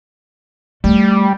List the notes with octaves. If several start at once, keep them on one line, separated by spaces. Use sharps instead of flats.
G3 A3